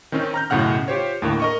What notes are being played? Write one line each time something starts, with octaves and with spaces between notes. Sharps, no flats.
D#3 C4 C#4 D#4
A#5 F6 G6
B1 F#2 A2 C#3 F#5 F6
F4 G4 C5 C#5
D#2 A2 D3 A#3
A#4 D#5 C#6